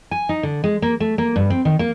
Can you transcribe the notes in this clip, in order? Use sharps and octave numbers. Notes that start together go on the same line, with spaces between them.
G#5
D#4
D3
G#3
A#3
A3
A#3
G2
C4
D#3
A#3